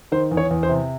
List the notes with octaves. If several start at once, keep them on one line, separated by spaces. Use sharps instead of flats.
D#3 C5
E2
C#5
E2
C5
C3